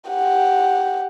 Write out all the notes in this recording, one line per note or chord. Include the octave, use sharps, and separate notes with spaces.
G4 F#5